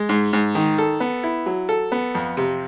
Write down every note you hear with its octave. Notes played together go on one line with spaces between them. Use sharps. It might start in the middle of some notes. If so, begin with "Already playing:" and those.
Already playing: G#3
G#2
G#2
D#3
A4
B3
E4
F#3
A4
B3
F2
C3